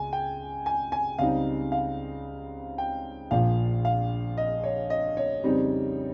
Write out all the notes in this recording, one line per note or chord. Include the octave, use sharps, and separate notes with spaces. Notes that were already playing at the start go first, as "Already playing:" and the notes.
Already playing: C#2 G#5
G5
G#5
G#5
C#2 C#3 G3 C4 D#4 F5
F5
G5
A#1 A#2 F3 F5
F5
D#5
C#5
D#5
C#5
F2 C#3 G3 C4 D#4